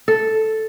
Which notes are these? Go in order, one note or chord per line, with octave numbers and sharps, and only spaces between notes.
A4